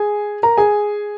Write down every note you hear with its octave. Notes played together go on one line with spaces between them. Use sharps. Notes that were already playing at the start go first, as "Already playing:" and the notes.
Already playing: G#4 G#5
A#4 A#5
G#4 G#5